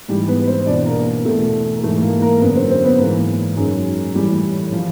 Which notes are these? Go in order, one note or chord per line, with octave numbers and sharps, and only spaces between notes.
G#2 E3 G3 G4
B3 B4
C4 C5
E2 B2 D4 D5
A#3 A#4
E2 B2 A3 A4
A#4
G#2 E3 A3 A4
A#3 A#4
A#3 A#4
F#2 D3 B3 B4
C4 C5
C4 C5
B3 B4
G#2 E3 A#3 A#4
F#2 D#3 G#3 G#4
A2 E3 G3 G4
E3 F3 F4